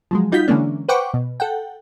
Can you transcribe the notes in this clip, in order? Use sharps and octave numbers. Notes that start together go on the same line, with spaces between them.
F3 F#3 G#3
G3 D#4 F4 F#4 G6 B6
D3 E3 G#3 A#3 C#4 D4
B4 C5 F#5 G5 C#6 D6
B2
A4 F#5 G5